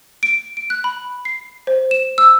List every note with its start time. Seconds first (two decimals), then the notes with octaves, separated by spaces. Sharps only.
0.23 D7
0.57 D7
0.70 F#6
0.84 B5
1.25 C7
1.67 C5
1.91 E7
2.18 E6